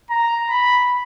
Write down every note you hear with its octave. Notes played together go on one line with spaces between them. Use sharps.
A#5
B5